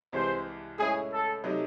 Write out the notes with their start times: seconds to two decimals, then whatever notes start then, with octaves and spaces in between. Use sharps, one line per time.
0.13 C2 C3 E3 G#3 C5
0.79 A2 G#3 C#4 E4 G#4
1.11 A4
1.44 C3 F#3 A3 D#4